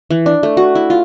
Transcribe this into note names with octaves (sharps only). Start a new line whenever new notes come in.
E3
D4
A3
F#4
E4
F4